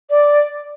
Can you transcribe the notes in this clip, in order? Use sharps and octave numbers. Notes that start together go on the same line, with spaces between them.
D5